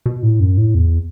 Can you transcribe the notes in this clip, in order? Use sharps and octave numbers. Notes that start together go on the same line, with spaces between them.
B2
A2
F#2
A2
E2